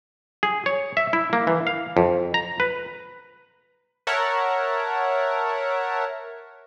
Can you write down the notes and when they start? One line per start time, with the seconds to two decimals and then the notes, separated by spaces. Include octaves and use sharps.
0.43 G#4
0.66 C#5
0.97 E5
1.13 E4
1.33 A#3
1.47 E3
1.67 F5
1.97 F2
2.34 A#5
2.60 B4
4.07 A#4 C#5 E5 F#5 A5